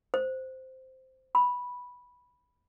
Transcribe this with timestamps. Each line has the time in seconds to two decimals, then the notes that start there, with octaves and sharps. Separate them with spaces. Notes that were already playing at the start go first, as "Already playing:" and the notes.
0.14 C5
1.35 B5